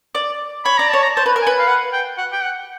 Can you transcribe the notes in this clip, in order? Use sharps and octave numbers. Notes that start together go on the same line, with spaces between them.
D5
C#5 B5
D5 A#5
C#5 A5
A#5
C5 A5
B4
A#4
G#5
B4
F5
F#5
G5
F#5
G5
F#5